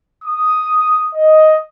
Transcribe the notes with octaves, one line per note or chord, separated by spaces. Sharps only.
D#6
D#5